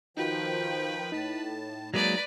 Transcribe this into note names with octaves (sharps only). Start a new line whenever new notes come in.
D#3 F3 D#4 F#4 B4 G5
A2 D#4 A5
F#3 G#3 A#3 B4 D5 A#5